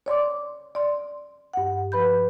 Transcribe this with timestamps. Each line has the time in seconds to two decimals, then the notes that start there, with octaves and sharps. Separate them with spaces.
0.06 C#5 D5 C6 D6
0.75 D5 C6
1.53 G2 F#5
1.92 F3 B4 B5 G6